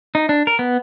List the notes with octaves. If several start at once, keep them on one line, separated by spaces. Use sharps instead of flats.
D#4
D4
A#4
B3